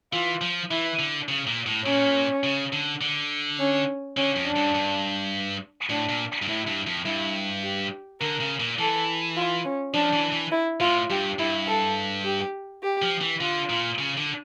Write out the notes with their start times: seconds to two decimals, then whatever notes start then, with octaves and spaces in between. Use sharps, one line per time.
0.13 E3 F4
0.41 F3
0.71 E3 E4
0.99 D3
1.28 C#3
1.47 A#2
1.66 A2
1.86 A#2 C#4
2.44 C#3
2.73 D3
3.01 D3
3.59 C#4
4.17 D3 C#4
4.36 F2
4.46 D4
4.56 G2
4.75 G2
5.89 A2 D4
6.09 A#2
6.42 G2
6.48 A2 E4
6.67 G2
6.87 F2
7.05 G2 E4
7.63 G4
8.21 D3 A#4
8.40 C#3
8.60 A#2
8.79 E3 A4
9.37 F4
9.65 C#4
9.94 F3 D4
10.13 E3
10.32 E3
10.52 E4
10.80 A2 F4
11.10 G2 G4
11.39 G2 E4
11.67 A4
12.25 G4
12.83 G4
13.02 F3
13.21 E3
13.40 D3 F4
13.70 A#2
13.98 C#3
14.17 D3